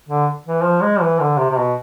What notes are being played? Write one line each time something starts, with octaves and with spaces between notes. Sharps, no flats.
D3
E3
F3
G#3
E3
D3
C3
C3
B2